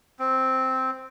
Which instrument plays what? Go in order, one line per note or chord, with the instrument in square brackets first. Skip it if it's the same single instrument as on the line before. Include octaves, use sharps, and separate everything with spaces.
[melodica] C4